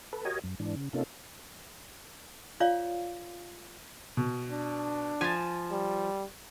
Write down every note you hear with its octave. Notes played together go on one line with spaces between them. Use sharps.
A4 B4
F#4 G4 A#4 C#5 D#5 G#5
F#2
G#2 E3 D4
C#3
C3 A#3 C#4 D#4 F4 A4
F4 C#5 D5 F5
B2
D4
F3 G#5 G#6 A6
G3